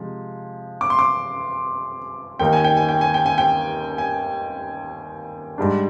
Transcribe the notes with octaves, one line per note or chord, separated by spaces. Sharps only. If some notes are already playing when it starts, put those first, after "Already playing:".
Already playing: C3 F3 G#3
D6
C6
D6
D#2 D#3 A#3 D#4 G5
G#5
G5
G#5
G5
G#5
G5
G#5
G5
G#5
G#2 G3 D4